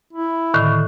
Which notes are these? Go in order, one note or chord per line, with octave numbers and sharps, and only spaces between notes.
E4
A2 D3 D#3